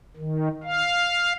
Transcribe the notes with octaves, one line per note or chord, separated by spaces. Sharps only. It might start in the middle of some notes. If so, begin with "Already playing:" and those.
D#3
F5